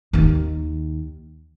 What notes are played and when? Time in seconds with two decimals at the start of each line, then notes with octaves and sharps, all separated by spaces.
0.13 D#2 D#3